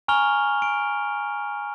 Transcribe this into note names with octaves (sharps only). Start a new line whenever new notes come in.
G#5 A#5 C#6 F6 F7 G7
D7